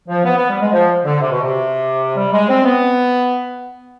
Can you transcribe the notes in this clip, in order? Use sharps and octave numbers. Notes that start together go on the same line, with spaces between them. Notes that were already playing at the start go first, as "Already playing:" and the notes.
F3
B3
B3
G3
G#3
F3
D3
C3
B2
C3
G3
G#3
C4
B3